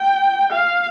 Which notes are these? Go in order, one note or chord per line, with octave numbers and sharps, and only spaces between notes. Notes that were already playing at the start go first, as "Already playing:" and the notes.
Already playing: G5
F5